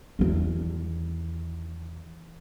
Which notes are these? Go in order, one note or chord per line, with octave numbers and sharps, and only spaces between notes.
E2 D#3